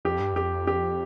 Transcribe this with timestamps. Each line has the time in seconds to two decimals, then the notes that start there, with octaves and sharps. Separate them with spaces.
0.05 F2 G4
0.20 G2
0.33 F2 G4
0.67 G4